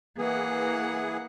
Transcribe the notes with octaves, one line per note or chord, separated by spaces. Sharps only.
E3 A#3 G#4 F#5